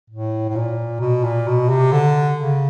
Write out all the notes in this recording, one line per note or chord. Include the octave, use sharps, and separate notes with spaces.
A2
A2
A#2
B2
A#2
B2
C3
D3
C#3